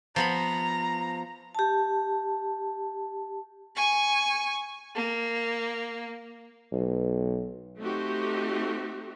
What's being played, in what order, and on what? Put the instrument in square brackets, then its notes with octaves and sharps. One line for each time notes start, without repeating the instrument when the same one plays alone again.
[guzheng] F3 B3 B5 [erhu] A#5
[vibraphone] G4 A5
[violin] G#5 C#6
A#3
[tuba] B1
[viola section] A3 C4 D#4 F#4 G4